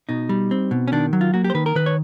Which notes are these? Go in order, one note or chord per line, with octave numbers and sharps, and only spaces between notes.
B2 D#4
G3
C4
B2
C#4
D#3 D4
F#3
F4
A#3 F#4
G4
C5
D#3 B4
A#4
D#3 B4
C#5